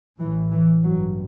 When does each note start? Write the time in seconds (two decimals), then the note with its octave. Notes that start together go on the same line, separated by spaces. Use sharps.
0.19 A1 A2 E3
0.52 E3
0.84 A1 G2 F#3